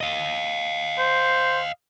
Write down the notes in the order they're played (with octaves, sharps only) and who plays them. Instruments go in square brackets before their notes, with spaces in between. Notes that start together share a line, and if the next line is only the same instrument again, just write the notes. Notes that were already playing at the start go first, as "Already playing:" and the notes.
[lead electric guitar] D#5 F5
[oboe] C5